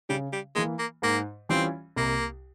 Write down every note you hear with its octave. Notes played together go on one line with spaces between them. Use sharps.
C#3 G3
G3
E3 G#3 A#3
A#3
G#2 A#3
E3 G3 C4 C#4 F4
C2 A#3